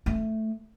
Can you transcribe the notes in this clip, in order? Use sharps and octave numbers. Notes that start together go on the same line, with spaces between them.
A3